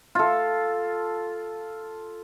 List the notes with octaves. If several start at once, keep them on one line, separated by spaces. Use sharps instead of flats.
F4 A4